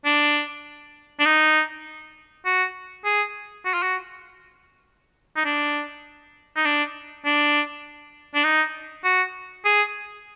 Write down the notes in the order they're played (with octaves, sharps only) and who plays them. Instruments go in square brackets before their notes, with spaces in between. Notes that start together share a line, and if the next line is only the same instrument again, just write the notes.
[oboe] D4
D4
D#4
F#4
G#4
F#4
F4
F#4
D#4
D4
D#4
D4
D4
D4
D#4
F#4
G#4